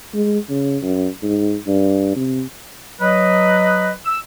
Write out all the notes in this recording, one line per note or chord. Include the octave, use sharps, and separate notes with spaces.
G#3
C#3
F#2
G#2
G2
C3
F#3 B4 D#5
E6